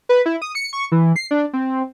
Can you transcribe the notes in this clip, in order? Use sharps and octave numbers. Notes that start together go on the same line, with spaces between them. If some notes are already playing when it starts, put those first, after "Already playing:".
B4
E4
D#6
C#7
C#6
E3
C7
D4
C4